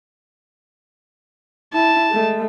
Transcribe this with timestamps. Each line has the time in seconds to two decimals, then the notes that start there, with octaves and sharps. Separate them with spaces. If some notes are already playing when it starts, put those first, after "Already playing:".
1.74 E4 A5
2.11 G#3 A3